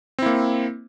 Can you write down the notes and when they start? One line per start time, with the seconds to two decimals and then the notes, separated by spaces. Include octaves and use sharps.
0.19 C4
0.22 E4
0.26 A#3